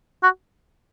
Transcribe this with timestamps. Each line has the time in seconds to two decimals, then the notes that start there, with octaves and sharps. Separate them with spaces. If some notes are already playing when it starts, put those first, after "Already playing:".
0.23 F#4